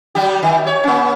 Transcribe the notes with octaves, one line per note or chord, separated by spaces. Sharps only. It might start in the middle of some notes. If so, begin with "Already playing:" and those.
F#3 G3 G4
D#3
C#5
A#3 C#4